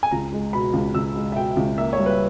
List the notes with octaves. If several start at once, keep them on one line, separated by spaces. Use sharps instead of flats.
G#5
C#2 A#5
G#3
B2 B5
C#2
C#2 E6
G#3
E5
B2 G5
C#2
A#3 E5
C#5
G3
B4